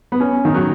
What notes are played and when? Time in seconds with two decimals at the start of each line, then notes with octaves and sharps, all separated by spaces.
0.12 B3
0.20 C#4
0.45 D#3
0.54 F#3